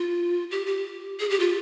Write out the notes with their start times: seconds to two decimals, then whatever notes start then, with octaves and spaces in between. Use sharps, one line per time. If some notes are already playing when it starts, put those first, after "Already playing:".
Already playing: F4
0.51 G4
0.66 G4
1.19 G#4
1.30 G4
1.40 F4